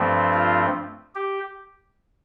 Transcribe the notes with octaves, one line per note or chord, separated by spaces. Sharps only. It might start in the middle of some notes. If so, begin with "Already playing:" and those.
Already playing: G2 F3 A3 C4
F4
G4